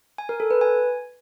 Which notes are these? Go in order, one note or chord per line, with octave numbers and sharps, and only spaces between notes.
G#5
A#4
A4
B4
G#5